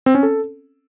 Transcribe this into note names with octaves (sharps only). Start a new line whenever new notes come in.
C4
C#4
A4